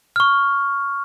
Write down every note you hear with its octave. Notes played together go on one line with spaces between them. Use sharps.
C#6 F6